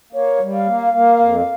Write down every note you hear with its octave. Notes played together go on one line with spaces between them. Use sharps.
A#3 C#5
G3
F5
A#3
A#3
F2